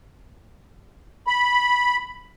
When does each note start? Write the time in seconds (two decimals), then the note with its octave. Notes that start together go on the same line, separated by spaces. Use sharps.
1.27 B5